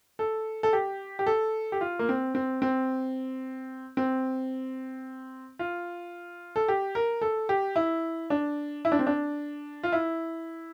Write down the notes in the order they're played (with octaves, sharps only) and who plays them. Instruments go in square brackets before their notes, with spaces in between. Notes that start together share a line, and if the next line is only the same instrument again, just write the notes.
[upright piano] A4
A4
G4
G4
A4
G4
F4
A#3
C4
C4
C4
C4
F4
A4
G4
A#4
A4
G4
E4
D4
E4
D4
C4
D4
F4
E4